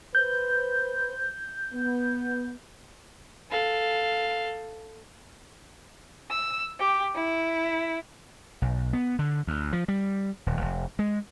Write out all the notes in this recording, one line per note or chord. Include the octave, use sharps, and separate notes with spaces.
B4 C5 G6
B3
A4 F5
E6
G4
E4
B1
B3
D3
D2
F3
G3
D#1
F1
G#3